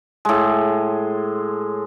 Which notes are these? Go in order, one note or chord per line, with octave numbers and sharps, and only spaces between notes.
A2 G#3